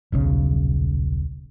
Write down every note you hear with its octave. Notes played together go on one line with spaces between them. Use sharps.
D#1 B1 C#3